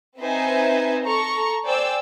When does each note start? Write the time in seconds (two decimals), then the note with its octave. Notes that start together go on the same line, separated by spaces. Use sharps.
0.18 C4 D#4 B4 C5 E5 G#5
1.05 A4 A#5 C#6
1.66 C5 D5 G5 G#5 E6